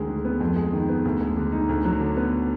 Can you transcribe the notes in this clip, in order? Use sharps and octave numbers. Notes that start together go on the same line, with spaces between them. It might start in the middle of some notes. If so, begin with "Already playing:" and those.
Already playing: D2 D#3 G#3
D3
B3
F2
G#3
D#3
B3
D2
G#3
D3
D#4
D2
F#3
D3
B3